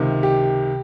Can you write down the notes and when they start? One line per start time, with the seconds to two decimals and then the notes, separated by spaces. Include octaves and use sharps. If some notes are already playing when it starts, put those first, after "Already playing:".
Already playing: C#2 C3 D#3
0.23 G4